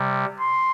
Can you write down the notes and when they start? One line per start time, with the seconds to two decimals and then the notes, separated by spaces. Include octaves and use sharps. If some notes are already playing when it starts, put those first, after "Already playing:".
Already playing: C3 G3
0.40 C6